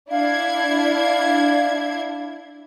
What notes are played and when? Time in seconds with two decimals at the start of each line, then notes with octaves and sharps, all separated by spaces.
0.11 D4 E4 F5 G#6